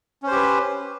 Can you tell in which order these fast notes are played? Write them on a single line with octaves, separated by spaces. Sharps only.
C#4 C5 G4 B4